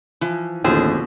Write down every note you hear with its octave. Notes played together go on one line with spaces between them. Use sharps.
E3 F3
A1 D#2 B2 D3 F3 G#4 C5